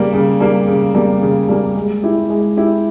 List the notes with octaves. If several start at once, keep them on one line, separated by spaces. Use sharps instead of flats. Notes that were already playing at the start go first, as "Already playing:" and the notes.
Already playing: C#3 G3 A#3
C#3
G3 A#3
C#3
G3 A#3
C#3
G3 A#3
G#3
E4 G4
G#3
E4 G4